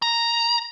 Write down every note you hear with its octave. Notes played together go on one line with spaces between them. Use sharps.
A#5